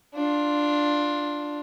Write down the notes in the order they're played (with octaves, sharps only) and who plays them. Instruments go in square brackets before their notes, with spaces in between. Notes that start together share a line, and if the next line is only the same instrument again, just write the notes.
[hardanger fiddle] D4 F4